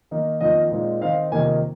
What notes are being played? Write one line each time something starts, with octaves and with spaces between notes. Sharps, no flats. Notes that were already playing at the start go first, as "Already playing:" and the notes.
D#3 A#3 D#4
F2 D#3 A#3 D#4 D#5
A#2 G#3 C4 D#4
D#3 C4 D#4 F5
F2 C3 D#3 A#3 D#4 G#5